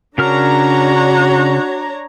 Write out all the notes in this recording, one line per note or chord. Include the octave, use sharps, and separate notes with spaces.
C#3 D4 F#4 A#4 C#5 A#5 F6